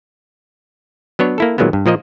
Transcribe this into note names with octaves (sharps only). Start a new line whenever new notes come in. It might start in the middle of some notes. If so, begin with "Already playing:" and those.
F#3 B3 D4 C#5
A#3 E4 A4
A#2 D#3 F#3 G#3 A#3 B3
G2
A#2 F3 A#3 D#5